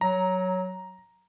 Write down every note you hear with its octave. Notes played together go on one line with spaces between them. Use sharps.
F#3 A#5